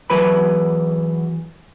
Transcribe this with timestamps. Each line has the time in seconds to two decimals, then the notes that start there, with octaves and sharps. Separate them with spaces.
0.10 E2 F#3 B4 B5